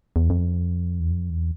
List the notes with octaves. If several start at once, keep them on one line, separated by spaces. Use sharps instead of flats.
E2
F2
E2
F2
E2